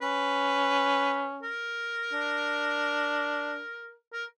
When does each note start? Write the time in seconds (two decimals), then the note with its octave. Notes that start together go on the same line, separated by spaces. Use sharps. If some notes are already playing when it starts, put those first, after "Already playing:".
0.02 C#4 B4
1.43 A#4
2.13 D4
4.13 A#4